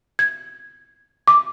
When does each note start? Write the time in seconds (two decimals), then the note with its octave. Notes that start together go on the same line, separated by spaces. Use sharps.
0.19 G#6
1.28 D6